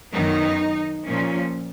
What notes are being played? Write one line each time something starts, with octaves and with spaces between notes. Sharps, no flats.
F#2 D#3 F#3 B3 D#4
A#2 F3 A#3 C#4